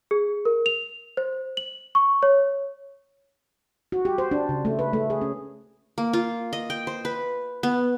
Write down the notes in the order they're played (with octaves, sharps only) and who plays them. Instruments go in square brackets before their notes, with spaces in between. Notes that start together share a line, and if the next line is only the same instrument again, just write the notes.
[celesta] G#4
A#4
F7
C5
F#7
C#6
C#5
[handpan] F#4
G4
C5
D4
C#3
A3
B4
A3
G#4
C#4
[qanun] A#3
F4
D#5
G5
C5
B4
B3